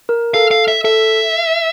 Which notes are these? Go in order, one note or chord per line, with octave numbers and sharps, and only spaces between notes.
A#4
A4 F5
F5
E5
A4 E5